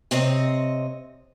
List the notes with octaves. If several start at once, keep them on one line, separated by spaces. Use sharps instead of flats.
C3 C4 C#5 D#5